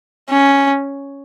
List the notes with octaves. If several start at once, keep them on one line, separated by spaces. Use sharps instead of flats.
C#4